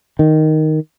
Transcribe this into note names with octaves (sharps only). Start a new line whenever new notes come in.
D#3